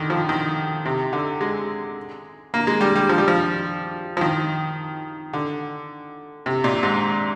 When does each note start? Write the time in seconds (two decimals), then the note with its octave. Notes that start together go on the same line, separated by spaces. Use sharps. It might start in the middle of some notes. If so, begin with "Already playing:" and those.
Already playing: D3 D#3
0.10 F3
0.29 D#3
0.85 C3
1.13 D3
1.41 G#3
2.54 A#3
2.67 G#3
2.81 G3
2.95 G3
3.09 F3
3.18 G3
3.28 F3
4.17 F3
4.21 D#3
5.33 D3
6.46 C3
6.64 A#2
6.83 G#2